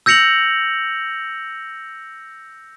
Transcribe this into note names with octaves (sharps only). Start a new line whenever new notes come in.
E6 G6 A#6 C#7 F7 F#7